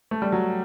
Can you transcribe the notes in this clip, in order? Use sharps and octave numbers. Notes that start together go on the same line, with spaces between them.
A3
G3
F#3